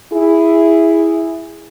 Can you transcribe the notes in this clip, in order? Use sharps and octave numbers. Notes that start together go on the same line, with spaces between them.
E4 G#4